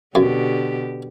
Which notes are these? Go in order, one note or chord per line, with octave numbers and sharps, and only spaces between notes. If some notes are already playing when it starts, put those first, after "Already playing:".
F#2 B2 D3 G4